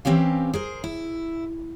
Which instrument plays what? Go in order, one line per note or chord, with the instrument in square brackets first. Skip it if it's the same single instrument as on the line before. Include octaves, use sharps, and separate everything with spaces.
[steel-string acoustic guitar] E3 C4 C#4 G4 F5
G#4 A#4 C5
E4